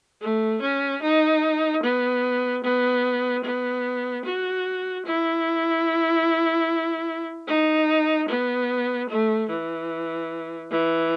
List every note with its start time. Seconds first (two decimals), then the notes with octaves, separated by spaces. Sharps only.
0.21 A3
0.62 C#4
1.02 D#4
1.83 B3
2.64 B3
3.44 B3
4.24 F#4
5.05 E4
7.48 D#4
8.29 B3
9.09 A3
9.49 E3
10.71 E3